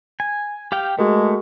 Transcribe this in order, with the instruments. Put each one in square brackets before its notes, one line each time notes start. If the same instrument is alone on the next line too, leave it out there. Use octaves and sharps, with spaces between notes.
[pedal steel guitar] G#5
G4 F5 G5
[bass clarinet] G#3 [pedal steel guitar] A3 [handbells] F#4 G#4 A#4